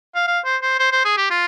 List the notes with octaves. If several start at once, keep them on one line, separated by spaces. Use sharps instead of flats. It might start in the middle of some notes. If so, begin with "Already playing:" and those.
F5
F5
C5
C5
C5
C5
G#4
G4
F4